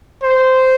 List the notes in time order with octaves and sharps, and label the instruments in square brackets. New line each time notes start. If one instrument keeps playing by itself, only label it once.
[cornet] C5